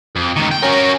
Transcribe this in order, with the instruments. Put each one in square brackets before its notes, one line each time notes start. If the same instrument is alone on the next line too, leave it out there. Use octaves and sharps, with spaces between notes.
[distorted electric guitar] F2
C#2 D#3
G5
[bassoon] C#4 [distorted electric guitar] F#4 A#4